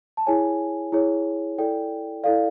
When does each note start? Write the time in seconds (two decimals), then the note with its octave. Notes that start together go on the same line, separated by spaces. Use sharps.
0.17 A5
0.27 E4 G#4 C#5 G#5
0.92 E4 G#4 C#5
1.58 E4 A4 D5 G5
2.24 E4 A4 D5 F5